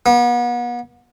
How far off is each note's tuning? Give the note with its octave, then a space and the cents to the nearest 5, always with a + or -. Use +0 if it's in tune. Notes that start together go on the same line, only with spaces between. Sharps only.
B3 -40